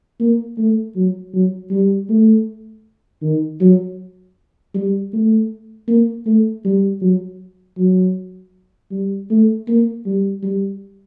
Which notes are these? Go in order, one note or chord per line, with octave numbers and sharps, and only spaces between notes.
A#3
A3
F#3
F#3
G3
A3
D#3
F#3
G3
A3
A#3
A3
G3
F#3
F#3
G3
A3
A#3
G3
G3